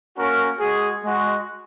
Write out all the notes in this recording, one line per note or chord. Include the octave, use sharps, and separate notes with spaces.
A#3 C#4 F#4 A#4
G#3 F#4 G#4
G#3 F#4